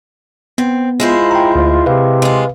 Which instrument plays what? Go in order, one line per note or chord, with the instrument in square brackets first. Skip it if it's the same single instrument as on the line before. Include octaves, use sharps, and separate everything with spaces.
[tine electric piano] B3 [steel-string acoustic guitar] C4
[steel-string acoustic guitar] G#3 E4 C5 [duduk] F4
[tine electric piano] G5 A#5
D2
[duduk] C3 [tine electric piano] B4 F5
[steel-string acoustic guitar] G#3 F4